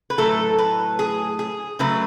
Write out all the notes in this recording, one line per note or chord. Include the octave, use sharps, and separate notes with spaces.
B4
A2 F#3 A3 A4
B4
G#4
G#4
C#3 F#3 A3 B4